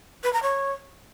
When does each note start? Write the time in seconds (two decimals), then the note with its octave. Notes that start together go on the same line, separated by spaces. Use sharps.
0.24 B4
0.33 A#5
0.43 C#5